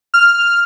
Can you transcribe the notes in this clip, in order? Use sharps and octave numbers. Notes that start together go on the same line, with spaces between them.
F6